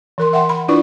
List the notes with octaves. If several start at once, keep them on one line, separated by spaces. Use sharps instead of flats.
E3 A#4 C6
E5 F#5 G5 C6
B5
D4 E4 F4 B4 D5 C#6